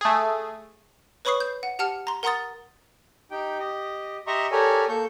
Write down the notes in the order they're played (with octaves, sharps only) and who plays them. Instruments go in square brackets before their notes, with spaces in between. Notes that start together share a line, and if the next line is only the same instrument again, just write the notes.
[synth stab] A3 G#4
[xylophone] B4 C#5 B5 C#6 D#6 C7
G6
F#5
G4 F#5 A5 F6 C#7
A#5 C6
A#4 F#5 A#5 C6 D#6 A6
[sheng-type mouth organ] D#4 G4 G5
G4 D#5
G4 D#5 E5 A#5 C6 C#6
G4 A4 A#4 C#5 D5 G#5
A#3 A4 C#6 G6